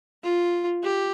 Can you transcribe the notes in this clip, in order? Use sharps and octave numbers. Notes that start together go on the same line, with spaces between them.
F4
G4